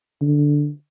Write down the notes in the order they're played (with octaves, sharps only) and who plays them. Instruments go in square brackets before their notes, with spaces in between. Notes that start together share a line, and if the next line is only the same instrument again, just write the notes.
[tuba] D3